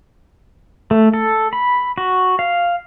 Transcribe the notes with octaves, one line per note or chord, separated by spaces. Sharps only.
A3
A4
B5
F#4
F5